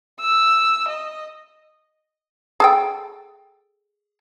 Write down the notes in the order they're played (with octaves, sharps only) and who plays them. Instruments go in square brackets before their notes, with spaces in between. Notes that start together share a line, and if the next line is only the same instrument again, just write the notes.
[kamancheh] E6
D#5
[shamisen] G#4 A4 G5